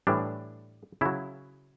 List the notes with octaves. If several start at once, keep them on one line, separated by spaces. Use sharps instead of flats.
A2 E3 G3 D4
C#3 F#3 E4